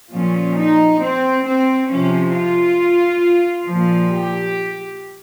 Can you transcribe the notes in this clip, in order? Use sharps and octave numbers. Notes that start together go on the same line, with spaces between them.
A#2 F3 C#4
D#4
C4
C4
C3 F3 C#4
F4
A#2 F3
G4